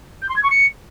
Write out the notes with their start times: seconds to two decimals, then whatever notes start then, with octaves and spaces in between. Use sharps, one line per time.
0.22 G6
0.29 C6
0.36 G#6
0.43 C#6
0.50 C#7